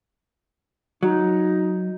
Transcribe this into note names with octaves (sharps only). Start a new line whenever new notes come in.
F#3 D#4